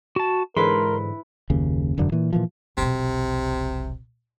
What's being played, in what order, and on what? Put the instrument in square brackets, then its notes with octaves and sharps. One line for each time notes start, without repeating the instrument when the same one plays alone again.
[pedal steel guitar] F#4 A5
[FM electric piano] G#2 D3 E3 [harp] E4 B4 B5 [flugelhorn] A#4 [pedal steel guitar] C6
[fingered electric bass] F#1 D#2 C#3
E1 F#2 D3
A#2 E3
A#2 E3 F3
[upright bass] E1 B1 [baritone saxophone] C3